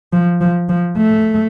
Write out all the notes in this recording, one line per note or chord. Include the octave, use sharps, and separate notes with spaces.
F3
F3
F3
A3